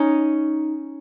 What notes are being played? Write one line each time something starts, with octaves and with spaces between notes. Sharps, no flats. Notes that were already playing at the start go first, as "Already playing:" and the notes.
Already playing: C#4 D#4